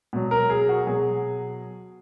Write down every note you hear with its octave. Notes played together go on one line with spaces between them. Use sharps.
B2 F#3
A#4
G#4
F#4
B2 F#3 G#4